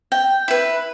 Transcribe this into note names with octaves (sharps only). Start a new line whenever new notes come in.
G5
E4 B4